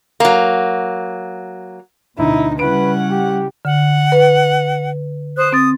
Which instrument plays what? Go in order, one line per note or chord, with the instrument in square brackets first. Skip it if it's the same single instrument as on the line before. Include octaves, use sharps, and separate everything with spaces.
[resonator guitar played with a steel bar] F#3 A#3
[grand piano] D2 [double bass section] B2 [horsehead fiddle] D#4 [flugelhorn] E4
[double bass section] C#3 G3 [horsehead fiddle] C#4 F#5 [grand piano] E4 D7 [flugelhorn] B4
[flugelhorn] G4
[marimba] D3 [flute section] F#5
[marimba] B4
[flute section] C5 D#6 F#6
[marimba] C4 A6 [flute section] D#6